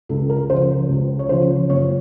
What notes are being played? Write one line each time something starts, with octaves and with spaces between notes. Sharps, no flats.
C#2 A4
A#4
C#3 F3 C5
C#2
C#5
C#3 F3 C5
F#1 C#5